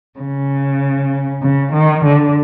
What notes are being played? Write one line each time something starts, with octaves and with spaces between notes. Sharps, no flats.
C#3
C#3
D#3
D3